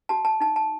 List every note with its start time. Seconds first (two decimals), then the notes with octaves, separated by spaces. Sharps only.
0.09 F#4 A5
0.25 A5
0.41 D#4 A5
0.56 A5